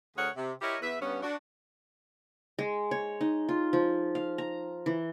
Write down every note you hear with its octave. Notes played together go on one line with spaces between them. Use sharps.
D2 G#4 A#4 C#5 F#5
C3
E4 G4 A#4 C#5 D#5 E5
E2 B4 E5
G2 B3 C#4
D4 F#4
G#3
C#5
D#4
F4
F3
F5
A#5
E3